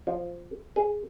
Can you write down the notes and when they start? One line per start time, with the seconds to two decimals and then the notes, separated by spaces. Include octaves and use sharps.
0.07 F3
0.76 G#4